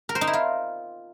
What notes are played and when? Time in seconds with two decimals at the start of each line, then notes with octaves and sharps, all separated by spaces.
0.09 A#4
0.15 C5
0.21 D#4
0.27 E4
0.33 F4